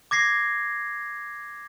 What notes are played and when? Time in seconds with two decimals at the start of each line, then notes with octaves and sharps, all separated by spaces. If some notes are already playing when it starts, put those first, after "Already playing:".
0.11 D6 G#6 A#6 C7